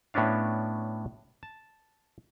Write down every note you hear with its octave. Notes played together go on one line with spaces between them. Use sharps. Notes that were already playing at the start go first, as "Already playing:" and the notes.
A2 B3 C#4 D4 F5
A5